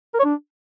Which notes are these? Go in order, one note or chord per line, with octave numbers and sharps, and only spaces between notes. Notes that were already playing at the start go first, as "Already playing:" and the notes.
A#4
C#5
D4